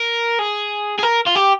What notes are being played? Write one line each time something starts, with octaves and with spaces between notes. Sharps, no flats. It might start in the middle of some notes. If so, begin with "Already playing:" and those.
Already playing: A#4
G#4
G#4
A#4
F4
G4